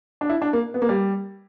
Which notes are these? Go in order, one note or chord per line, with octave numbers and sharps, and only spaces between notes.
D4
E4
D4
A#3
B3
A#3
G3